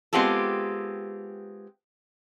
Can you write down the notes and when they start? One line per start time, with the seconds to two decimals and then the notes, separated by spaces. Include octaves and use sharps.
0.13 G#3 B3 C4 F4 G4 A4